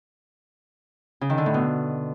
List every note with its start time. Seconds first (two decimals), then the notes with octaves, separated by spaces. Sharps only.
1.21 C#3
1.30 D#3
1.38 D3
1.46 A2
1.54 B2